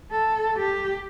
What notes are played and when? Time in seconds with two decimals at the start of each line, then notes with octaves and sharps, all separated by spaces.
0.11 A4
0.57 G4